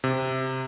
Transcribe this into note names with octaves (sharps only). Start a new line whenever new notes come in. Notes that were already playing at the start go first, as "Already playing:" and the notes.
C3